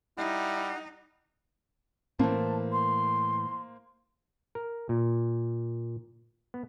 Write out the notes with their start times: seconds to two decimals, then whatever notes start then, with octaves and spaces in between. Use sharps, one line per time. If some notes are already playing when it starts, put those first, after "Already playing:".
0.18 G3 D#4 E4 F#5
2.19 A2 E3 A#3 C5 A5
2.71 C6
4.55 A#4
4.89 A#2
6.54 B3